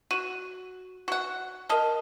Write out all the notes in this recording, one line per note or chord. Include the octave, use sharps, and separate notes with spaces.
F#4 D#7
F#4 F#5
A#4 D#5 F5 A5